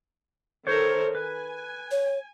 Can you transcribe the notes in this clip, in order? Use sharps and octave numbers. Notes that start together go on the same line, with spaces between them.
D#3 A4 A#4 C5 C#5
B4 G#5
C#5